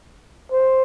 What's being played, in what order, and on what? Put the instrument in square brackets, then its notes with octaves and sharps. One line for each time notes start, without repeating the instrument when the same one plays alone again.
[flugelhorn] C5